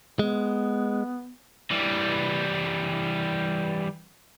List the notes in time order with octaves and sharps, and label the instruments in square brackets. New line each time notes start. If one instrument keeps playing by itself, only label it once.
[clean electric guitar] G#3 [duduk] B3
[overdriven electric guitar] E3 G3